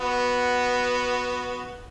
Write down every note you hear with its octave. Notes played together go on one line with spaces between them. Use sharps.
B3 F#4